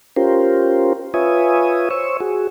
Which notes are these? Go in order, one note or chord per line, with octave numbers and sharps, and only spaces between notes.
C#4 F4 G4 A#4 C5
F4 B4 C#5 E5 G#5 D#6
C5 C#5 C#6 E6
F#4 G#4